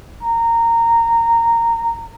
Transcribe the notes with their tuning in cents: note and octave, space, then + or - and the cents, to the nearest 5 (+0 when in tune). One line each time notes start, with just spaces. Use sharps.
A#5 -15